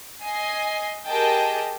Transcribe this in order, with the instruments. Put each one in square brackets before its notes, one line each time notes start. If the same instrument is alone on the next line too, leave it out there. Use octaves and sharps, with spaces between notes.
[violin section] D#5 G#5 C7
G4 G#4 A#4 D#5 G5 A5